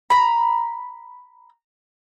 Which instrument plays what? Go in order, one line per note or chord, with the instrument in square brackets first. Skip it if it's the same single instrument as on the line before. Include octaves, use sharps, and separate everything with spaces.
[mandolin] A#5 B5